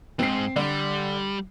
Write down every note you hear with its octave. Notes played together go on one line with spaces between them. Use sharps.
F2 G#2 C4 C7
D3 G3